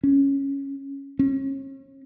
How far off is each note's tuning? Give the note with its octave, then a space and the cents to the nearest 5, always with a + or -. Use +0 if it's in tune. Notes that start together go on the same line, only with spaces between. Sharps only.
C#4 +0
C#4 -40